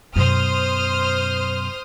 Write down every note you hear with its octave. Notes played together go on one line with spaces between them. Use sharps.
F#2 B2 C5 D#6 F6